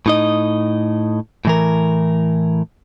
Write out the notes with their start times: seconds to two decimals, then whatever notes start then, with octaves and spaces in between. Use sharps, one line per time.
0.06 A2 D#4 D#5
1.45 A2 E3 A#4